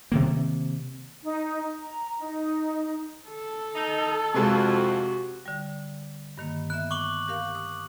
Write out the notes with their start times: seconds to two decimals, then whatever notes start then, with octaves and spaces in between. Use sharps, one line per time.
0.12 C3 D#3 A#3
1.23 D#4
1.81 A#5
2.20 D#4
3.28 A4
3.75 D#4
4.34 F2 C3 G#3 F#4
5.46 D3 G3
6.38 G2 D#3 A#3
6.70 B3 E5 F#6
6.91 C#6 D6 F#7
7.28 G4 A#4 F5
7.55 D#6